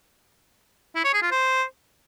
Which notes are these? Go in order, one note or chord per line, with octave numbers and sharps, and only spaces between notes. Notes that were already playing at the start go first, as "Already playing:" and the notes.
E4
C#5
G#4
F4
C5